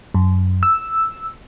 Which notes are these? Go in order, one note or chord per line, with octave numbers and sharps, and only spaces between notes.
F#2
E6